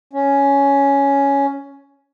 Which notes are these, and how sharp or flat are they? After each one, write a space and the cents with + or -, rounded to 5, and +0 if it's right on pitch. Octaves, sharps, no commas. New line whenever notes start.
C#4 +10